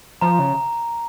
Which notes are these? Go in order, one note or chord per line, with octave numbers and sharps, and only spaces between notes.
F3 A#5
C#3